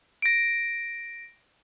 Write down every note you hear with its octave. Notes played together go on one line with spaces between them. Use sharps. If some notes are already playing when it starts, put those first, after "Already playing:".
A#6 D7